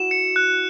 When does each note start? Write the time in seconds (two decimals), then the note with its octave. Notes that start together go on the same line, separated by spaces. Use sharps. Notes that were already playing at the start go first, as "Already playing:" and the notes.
Already playing: E4 F#4 E7
0.11 C#7
0.36 F#6